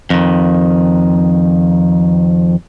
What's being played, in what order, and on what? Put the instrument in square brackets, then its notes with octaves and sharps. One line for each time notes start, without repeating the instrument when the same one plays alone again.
[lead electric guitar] F2 D#3